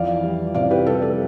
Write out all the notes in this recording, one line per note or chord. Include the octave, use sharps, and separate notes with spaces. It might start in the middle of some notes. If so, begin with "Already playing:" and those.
Already playing: F2 E3 D5 F5
G3
C3 D5 F5
G4 B4
G3 A4
A4